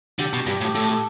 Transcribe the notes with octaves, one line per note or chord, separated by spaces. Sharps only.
D3 G4
B2
G2 G4
A2
G4
A2 A4
A4